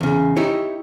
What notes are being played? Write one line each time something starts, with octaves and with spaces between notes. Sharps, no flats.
E2 C#3
D#4 E4 G4 C#5